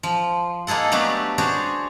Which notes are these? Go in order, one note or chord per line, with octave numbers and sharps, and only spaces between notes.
F3
A#3 D#4 G#4 A4 F#5
F#3 A3 B3 D4 G4
D4 F#4 G#4 C5 C#5